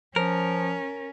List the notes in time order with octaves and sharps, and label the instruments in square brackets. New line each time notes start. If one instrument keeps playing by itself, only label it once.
[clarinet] F3 [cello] C#4 [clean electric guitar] A#4